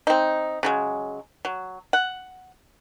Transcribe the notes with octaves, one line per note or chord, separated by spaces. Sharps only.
C4 D#4
C#3 F#3 G#3
F#3
F#5